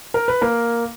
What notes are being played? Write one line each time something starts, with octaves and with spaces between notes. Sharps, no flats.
A#4
B4
A#3 A#4